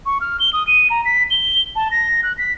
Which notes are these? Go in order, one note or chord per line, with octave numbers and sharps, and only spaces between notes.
C#6
F6
G7
D#6
D#7
A#5
B6
G7
A5
A#6
F#6
B6